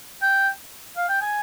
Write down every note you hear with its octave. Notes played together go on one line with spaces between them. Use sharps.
G5
F5
G5
G#5